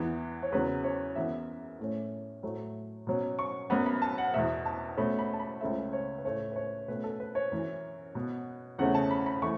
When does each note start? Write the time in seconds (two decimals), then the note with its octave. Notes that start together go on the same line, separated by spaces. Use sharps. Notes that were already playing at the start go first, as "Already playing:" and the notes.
Already playing: E2 E3 B3
0.42 C#5
0.52 E2 C#3 F#3 B4
0.84 C#5
1.16 F#2 E3 B3 E5
1.79 A2 A3 C#4
2.43 A2 F#3 A3
3.07 B2 F#3 C#4
3.39 C#6
3.70 F#2 F#3 B3 B5
3.86 B5
4.02 A5
4.18 F#5
4.34 E2 B2 B3 E5
4.65 A5
4.97 B2 A3 C#4 B5
5.19 B5
5.33 A5
5.39 B5
5.61 C#2 C#3 A3 C#4 E5
5.93 C#5
6.18 B4
6.24 A2 A3 C#4 C#5
6.52 B4
6.56 C#5
6.88 B2 A3 C#4 B4
7.04 A4
7.20 B4
7.35 C#5
7.52 F#2 E3 C#4
8.15 B2 B3
8.78 E2 C#3 A3 C#4 F#5
8.94 A5
9.10 B5
9.26 B5
9.42 E3 A3 C#6